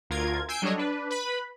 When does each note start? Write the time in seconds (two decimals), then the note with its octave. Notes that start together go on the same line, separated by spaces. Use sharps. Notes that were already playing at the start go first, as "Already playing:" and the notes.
0.10 D2 F4 A#4 G#6
0.48 G#5 E6 G6 C7 D7
0.62 F#3 G3 D4 A4 C#5 D#5
0.78 D4 B4
1.10 B4 B5